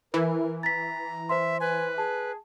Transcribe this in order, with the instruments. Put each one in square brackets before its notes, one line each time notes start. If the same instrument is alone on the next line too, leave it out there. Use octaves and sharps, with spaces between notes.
[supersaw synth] E3 [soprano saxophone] A#4
[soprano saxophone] A#5 [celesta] A6 B6
[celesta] C5 C6 [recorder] E5
[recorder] B4 [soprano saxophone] G#5
[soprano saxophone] G#4 [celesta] A5